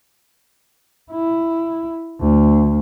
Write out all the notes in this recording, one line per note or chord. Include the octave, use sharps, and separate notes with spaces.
E4
D2